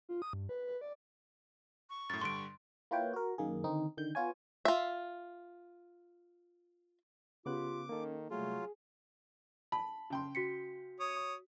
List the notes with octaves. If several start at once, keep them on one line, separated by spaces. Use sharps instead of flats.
F4
D#6
G2
B4
B4
D5
C#6
F#2 A2 A6
G2 D3 G3 C6 D7
A#3 E4 F4 B4 C#5 G5
F#4 A#4
F#2 D#3 A#3 G#4
D3 D#3 C4 D#4
D3 D#3 G6
B3 F4 C#5 G#5
F4 E5
C#3 B3 F4 G4 D6 F#6
D#3 A#3 C#4 A4
C3 F#3 G3 A3 F4 G#4
A5 B5
C#3 G5 C6
F#4 B6 C#7
C#5 D#6